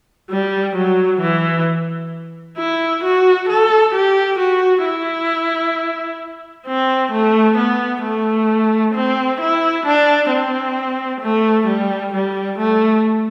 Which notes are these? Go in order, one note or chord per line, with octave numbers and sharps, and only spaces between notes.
G3
F#3
E3
E4
F#4
A4
G4
F#4
E4
C4
A3
B3
A3
C4
E4
D4
C4
A3
G3
G3
A3